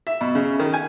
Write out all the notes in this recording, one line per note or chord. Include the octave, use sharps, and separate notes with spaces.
E5
B2
C#3
D#3
G#5